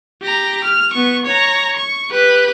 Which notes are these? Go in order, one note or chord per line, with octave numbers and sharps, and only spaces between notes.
G4 A#5
F6
B3 C#6
C#5 A#5
C#6
G4 B4